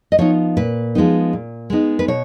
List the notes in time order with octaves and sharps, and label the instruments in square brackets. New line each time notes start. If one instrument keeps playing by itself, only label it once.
[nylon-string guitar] D#5
F3 B3 D#4 C#5
A#2 B4
F3 G#3 B3 D#4
A#2
G#3 B3 D#4
B4
B2 C#5